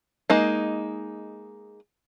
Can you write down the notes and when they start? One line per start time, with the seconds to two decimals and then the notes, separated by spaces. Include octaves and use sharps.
0.30 G#3 A#3 D#4